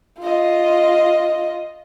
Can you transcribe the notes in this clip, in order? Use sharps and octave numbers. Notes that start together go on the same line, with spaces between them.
F4 D#5